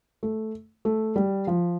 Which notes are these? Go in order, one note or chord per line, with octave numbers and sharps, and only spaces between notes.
A3
A3
G3
F3